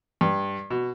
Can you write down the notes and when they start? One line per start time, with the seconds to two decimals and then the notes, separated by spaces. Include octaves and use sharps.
0.21 G2
0.70 B2